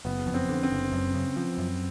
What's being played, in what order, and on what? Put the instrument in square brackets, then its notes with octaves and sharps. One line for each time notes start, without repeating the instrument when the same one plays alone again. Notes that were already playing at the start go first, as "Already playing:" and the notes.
[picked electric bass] F#1 [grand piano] B3
[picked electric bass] F2
[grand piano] C4
[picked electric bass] D3
[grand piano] C4
[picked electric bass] F#1
F#2
C#3
F3
F#2